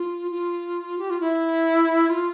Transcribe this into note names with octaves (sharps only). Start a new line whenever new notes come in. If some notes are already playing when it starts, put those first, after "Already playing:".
Already playing: F4
F4
G4
F4
E4
F4